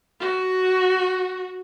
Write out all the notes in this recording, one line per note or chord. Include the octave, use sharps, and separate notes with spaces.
F#4